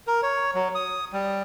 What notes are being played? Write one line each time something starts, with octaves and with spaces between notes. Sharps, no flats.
A#4
C#5
F#3
D#6
G3